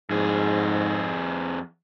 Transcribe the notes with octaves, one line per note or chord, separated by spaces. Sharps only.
F2 G#2 G#4